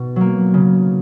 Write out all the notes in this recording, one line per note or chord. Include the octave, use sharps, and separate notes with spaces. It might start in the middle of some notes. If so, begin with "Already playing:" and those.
Already playing: B2
F#3 A#3
C#3